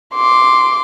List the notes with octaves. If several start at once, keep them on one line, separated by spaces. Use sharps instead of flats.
C6 D6